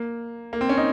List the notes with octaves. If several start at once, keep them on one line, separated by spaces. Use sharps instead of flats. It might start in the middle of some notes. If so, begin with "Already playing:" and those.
Already playing: A#3
A#3
C4
C#4
D#4